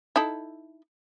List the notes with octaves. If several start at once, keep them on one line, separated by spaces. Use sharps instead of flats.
D#4 E4 A4